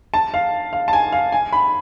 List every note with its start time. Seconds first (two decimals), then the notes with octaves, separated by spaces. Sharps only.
0.14 A5
0.34 F5
0.73 F5
0.88 A5
0.93 G#5
1.12 F5
1.32 G#5
1.53 B5